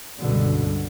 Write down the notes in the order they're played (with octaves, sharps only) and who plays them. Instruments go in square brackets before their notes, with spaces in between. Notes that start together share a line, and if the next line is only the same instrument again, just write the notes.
[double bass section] C#2 G2 B2 D3